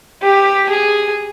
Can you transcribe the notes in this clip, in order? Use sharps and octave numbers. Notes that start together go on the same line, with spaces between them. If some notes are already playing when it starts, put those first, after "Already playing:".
G4
G#4